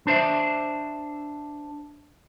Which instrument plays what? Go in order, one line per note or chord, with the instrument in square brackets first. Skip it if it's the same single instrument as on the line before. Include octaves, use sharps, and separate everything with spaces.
[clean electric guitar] D4 C5 E5